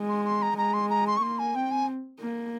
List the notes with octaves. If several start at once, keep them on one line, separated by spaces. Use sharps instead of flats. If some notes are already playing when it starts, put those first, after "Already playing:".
Already playing: G#3
C6
C6
A#5
G#3 A#5
C6
A#5
C6
C#6
A#3 C6
G#5
C4 G5
G#5
A#3